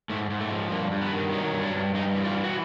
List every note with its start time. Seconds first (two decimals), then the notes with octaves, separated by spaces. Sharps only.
0.10 G#2 A3
0.30 G#2
0.40 A3
0.50 F3
0.71 G2 A#3
0.91 G2
1.02 B3
1.12 D#3
1.32 F#3 D#4
1.54 G2
1.63 D4
1.74 G2
1.95 G2 D#4
2.15 E3
2.24 F4
2.35 E3
2.44 F#4